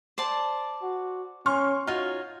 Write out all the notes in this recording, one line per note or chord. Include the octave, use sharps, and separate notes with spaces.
C5 D5 A5
F#4
C#4 C6 C#6 F6
D#4 F4 F#4 C#5 F6